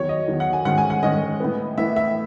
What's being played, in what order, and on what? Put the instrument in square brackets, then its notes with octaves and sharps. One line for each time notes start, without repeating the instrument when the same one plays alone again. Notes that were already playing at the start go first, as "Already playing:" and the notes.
Already playing: [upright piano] E2 D#3 F#3 C#5
D#5
E2 D#3 F#3
F#5
G#5
G#2 D#3 G#3 C#4 F#5
G#5
F#5
G#2 D#3 G#3 C#4 D#5
A2 E3 B3
A2 E3 B3 E5
E5